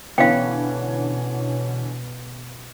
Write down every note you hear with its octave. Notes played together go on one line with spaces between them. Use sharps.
B2 D3 E3 B3 C#4 F5 G5